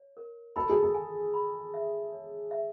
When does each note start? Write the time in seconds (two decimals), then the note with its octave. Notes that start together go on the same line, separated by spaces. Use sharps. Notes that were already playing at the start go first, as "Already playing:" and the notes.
Already playing: C#5
0.17 A#4
0.56 A4 B5
0.69 G#4
0.83 A4
0.95 G#5
1.34 B5
1.74 E5
2.12 C#5
2.51 E5